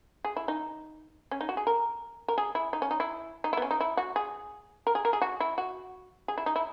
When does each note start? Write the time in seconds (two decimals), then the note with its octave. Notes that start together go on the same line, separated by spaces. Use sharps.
0.25 G#4
0.36 E4
0.48 D#4
1.31 C#4
1.41 D#4
1.49 F#4
1.57 G#4
1.67 A#4
2.28 A#4
2.38 G#4
2.55 E4
2.73 D#4
2.82 C#4
2.91 D#4
3.00 E4
3.44 D#4
3.53 E4
3.57 B3
3.62 C#4
3.71 D#4
3.80 E4
3.97 F#4
4.16 G#4
4.87 A#4
4.95 G#4
5.05 A#4
5.13 G#4
5.22 F#4
5.40 E4
5.58 F#4
6.28 G#4
6.38 E4
6.46 D#4
6.56 E4